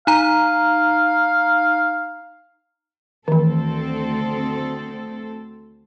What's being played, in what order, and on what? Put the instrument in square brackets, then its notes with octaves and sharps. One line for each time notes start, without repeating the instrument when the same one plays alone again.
[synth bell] D#4 A#5 [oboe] F5
[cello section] D2 C4 A4 [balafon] D#3 E3